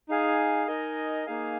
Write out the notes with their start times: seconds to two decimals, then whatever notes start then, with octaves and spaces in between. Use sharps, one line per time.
0.09 D#4 G#4 F5 G#5
0.67 D#4 A#4 D#5 G#5
1.26 A#3 D#4 G#4 F5 G#5